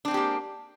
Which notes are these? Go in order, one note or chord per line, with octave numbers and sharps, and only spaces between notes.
G#3 A#3 C4 D4 G4